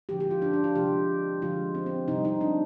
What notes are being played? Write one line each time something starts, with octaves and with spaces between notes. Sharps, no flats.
D3 F3 G#3 G4
G4
F4
D4
D4
F4
C3 F3 G#3 G4
D3 F3 G#3 F4
C4
C4
C3 G3 D#4
D#4
D4